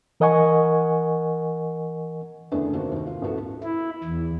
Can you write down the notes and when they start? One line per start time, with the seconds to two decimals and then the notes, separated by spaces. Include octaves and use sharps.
0.20 E3 A#4 D#5 F#5 G#5 C#6
2.52 F#1 E2 D3 A3 B3 D4
2.74 C3 D#3 A#3 C4 F#4
2.92 D#2 D#4
3.07 F4
3.22 A1 E3 A3 B3 F#4 A4
3.63 E4
4.04 E2